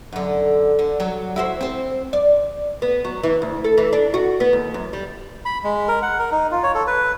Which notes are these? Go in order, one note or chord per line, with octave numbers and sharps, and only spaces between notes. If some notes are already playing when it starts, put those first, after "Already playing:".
F#2 D3
D3
F#3
E4 F#4 C5
C4 C5
D5
B3
F#3
E3
D2
A4
E3
D4
F#4
B3
D#2
F#2
G3
B5
G#3
A#4
F#5
A#4
D#4
F4
C#5
A4
B4